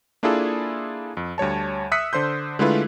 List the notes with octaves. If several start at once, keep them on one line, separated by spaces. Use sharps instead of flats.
A#3 D4 E4 F4 G#4 A4
F2
D2 G3 C#5 A5
E5 D#6 E6 F#6 B6 C#7
D3 C5 C6 G6
D3 G#3 A3 E4 F4 B4